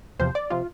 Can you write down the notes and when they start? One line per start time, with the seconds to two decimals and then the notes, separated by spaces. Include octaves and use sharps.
0.19 E2 C3 F3 C5
0.35 D5
0.50 C3 F3 F4